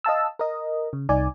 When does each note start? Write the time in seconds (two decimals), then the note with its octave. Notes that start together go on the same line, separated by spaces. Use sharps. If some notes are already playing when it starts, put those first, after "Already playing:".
0.04 D#5 F5 A5 E6
0.39 A#4 D#5
0.93 C#3
1.09 C2 D#4 D5 G#5